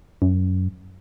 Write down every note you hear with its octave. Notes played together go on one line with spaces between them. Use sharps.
F#2